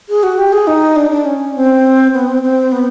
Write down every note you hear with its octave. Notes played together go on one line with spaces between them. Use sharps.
G#4
F#4
G4
G#4
D#4
D4
D4
C#4
C4
B3
C4
C4
B3